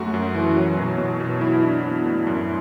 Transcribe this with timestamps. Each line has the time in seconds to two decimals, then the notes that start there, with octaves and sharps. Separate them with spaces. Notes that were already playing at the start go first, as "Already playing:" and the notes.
Already playing: F#2 A3 F#4
0.14 F#2
0.35 E3
0.57 F#3
0.77 B2
0.98 B2
1.20 B2
1.41 F#3 E4
1.63 D4
1.84 B3
2.05 A2
2.27 F#2